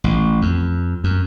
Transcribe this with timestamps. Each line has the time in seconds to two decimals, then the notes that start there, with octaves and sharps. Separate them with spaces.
0.04 A1
0.42 F2
1.04 F#2